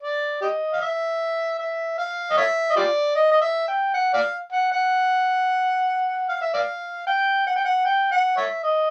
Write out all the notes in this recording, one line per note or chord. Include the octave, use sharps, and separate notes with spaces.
D5
G4 D#5
F5
E5
E5
F5
D#5
C#5 E5
D#5
F4 G4 D5
D#5
D#5
E5
G5
F#5
D5 F5
F#5
F#5
F5
E5
D5 F5
G5
F#5
G5
F#5
G5
F#5
C#5 E5
D#5